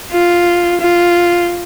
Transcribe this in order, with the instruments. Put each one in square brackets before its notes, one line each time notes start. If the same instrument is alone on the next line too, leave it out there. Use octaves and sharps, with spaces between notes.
[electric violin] F4
F4